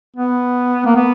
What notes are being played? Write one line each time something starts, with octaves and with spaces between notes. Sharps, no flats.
B3
A#3
B3